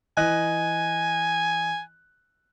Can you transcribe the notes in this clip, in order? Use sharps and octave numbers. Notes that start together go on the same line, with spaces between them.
E3 D#5 G#5 F#6